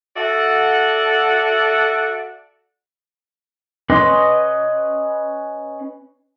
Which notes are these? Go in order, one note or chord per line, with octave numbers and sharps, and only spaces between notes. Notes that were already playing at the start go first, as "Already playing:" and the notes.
F#4 A4 D5 E5 F#5
C#4 B4 D#5 C6 D6